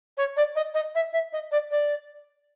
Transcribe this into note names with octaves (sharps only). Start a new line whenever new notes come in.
C#5
D5
D#5
D#5
E5
E5
D#5
D5
D5